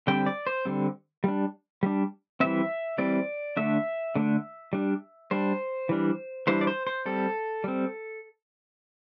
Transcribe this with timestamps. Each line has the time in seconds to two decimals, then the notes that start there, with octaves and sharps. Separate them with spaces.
0.07 D3 G3 C4 G5
0.26 D5
0.47 C5
0.65 D3 G3 C4
1.24 G3 D4
1.83 G3 D4
2.40 E3 G3 C4 E5
2.98 E3 G3 C4 D5
3.57 D3 A3 D4 E5
4.16 D3 A3 D4
4.73 G3 D4
5.31 G3 D4 C5
5.89 E3 G3 D4
6.47 E3 G3 D4 C5
6.61 D5
6.67 C5
6.87 C5
7.06 G3 C4 A4
7.64 G3 C4